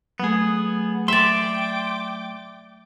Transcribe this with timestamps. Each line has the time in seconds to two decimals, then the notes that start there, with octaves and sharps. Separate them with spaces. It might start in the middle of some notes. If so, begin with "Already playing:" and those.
0.20 F#3 A3 B3 G#4
1.08 D5 E5 G5 C6 D6